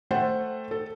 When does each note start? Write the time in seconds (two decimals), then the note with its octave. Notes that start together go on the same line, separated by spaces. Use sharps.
0.11 A3 A4 C5 F#5 G5
0.71 A4